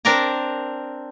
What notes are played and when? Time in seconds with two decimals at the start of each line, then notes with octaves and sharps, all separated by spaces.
0.05 C4 D4 A#4 A5 A#5